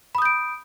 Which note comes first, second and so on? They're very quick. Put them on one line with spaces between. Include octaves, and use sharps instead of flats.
B5 D#6 G6 D7